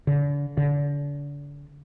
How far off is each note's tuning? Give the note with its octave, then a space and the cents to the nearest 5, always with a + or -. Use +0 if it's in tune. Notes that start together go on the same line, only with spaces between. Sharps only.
D3 -40
D3 -35